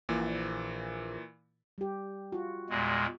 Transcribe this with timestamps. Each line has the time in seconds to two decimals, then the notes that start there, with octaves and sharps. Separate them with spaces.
0.09 A#1 A#2 E3
1.78 G3 G4
2.32 F4 F#4
2.70 E2 A#2 G#3